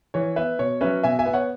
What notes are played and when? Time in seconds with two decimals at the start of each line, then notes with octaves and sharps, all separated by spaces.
0.14 E3 C#5
0.36 B3 B4 E5
0.59 B2 C#5
0.81 F#3 C#4 B4 E5
1.03 B2 E5 G#5
1.19 E5 G#5
1.26 B3
1.34 C#5 F#5